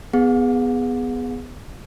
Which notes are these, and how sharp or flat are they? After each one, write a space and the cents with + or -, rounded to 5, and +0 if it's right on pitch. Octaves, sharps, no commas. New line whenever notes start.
B3 +10 G#4 -10 F#5 -45